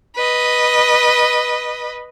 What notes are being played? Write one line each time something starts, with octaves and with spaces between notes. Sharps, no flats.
B4 D#5